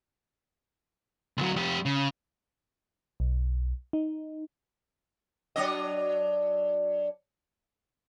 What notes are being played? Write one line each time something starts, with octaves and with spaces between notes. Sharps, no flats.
D2 F#3
F2 G4
C#3
B1
D#4
F#3 D4 D#5